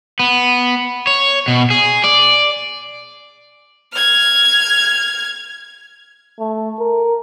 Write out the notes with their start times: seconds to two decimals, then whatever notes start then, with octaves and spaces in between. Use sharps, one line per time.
0.19 B3
1.07 C#5
1.48 B2
1.70 G#4
2.04 D5
3.93 F6 G#6
6.40 A3
6.79 A#4